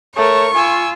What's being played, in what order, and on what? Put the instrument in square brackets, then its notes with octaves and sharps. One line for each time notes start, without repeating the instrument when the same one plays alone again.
[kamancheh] A3 A#4 [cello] C#5 [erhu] C#6
[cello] F4 [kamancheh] G#5 E6